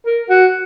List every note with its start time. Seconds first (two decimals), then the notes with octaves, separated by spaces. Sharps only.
0.06 A#4
0.29 F#4